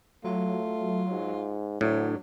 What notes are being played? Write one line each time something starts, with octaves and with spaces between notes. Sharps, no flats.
F#3 A3 F4
G#2
D2 A2 F#3 D4